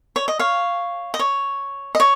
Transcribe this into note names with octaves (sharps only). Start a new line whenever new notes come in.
C#5
D#5
C#5 F5
D#5
C#5
D#5
C#5